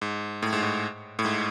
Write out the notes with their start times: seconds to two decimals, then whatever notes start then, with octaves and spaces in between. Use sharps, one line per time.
0.02 G#2
0.43 A2
0.53 G#2
0.63 A2
1.19 A2
1.25 G#2